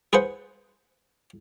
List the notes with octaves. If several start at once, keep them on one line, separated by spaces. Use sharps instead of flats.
G#4 B4 C5 F#5